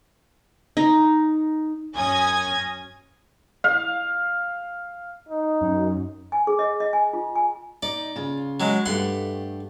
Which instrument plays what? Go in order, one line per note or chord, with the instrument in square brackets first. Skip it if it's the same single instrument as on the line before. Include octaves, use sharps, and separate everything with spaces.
[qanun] D#4
[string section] F#2 C#4 G#5 D#6 G#6 A#6
[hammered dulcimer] F5
[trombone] D#4
[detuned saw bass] F#2
[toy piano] G#5
G#4
D#5
D#5
G#5
F4
G#5
[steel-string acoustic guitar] D#4 [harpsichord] D5
[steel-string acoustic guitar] C#3 F4
[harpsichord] F#3 G#3
[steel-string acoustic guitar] G2 A3 G4 [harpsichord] F#5 C6